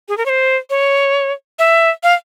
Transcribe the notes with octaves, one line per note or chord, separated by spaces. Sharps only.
G#4
A#4
C#5
C5
C#5
E5
F5